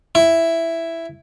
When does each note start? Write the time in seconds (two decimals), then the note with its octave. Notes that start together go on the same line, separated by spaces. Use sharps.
0.15 E4